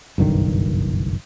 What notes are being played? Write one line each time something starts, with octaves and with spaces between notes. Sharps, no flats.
F#1 B1 G2 D#3